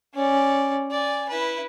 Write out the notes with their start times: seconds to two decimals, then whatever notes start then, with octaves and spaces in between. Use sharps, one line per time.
0.14 C#4 D5
0.91 D5 G#5
1.29 E4 B4